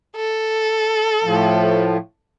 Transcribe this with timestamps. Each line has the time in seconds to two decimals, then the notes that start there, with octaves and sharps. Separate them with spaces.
0.16 A4
1.24 A2 F3